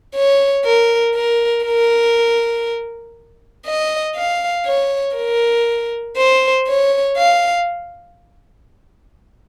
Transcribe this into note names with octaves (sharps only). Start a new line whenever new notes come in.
C#5
A#4
A#4
A#4
D#5
F5
C#5
A#4
C5
C#5
F5